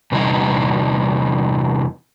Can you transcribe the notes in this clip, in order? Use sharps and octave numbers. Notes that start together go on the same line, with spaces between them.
E2 C3 G3 D#4 E4 F#5